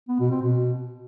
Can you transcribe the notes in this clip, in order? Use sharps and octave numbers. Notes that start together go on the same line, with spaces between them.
B3
B2
C4
B2